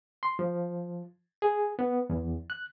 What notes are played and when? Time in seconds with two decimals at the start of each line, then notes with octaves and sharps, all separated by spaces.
0.23 C6
0.39 F3
1.42 G#4
1.79 B3
2.10 E2
2.50 F#6